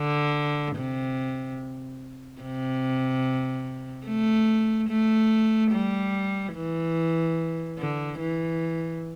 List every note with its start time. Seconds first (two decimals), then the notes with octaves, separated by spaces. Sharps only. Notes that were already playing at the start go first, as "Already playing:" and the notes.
Already playing: D3
0.76 C3
2.42 C3
4.06 A3
4.89 A3
5.72 G3
6.54 E3
7.78 D3
8.19 E3